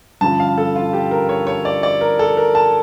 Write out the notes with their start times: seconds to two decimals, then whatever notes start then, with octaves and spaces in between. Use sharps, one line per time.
0.21 G2 D3 F3 C#4 A5
0.40 F5
0.58 A4
0.76 F4
0.93 G4
1.11 A#4
1.29 C#5
1.47 C#5
1.65 D5
1.83 D5
2.01 A#4
2.19 A4
2.37 A#4
2.55 A5